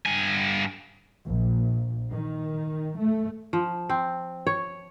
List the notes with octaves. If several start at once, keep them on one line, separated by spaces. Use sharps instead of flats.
G2 G#5
A#1
D#3
A3
F3
C4
C#5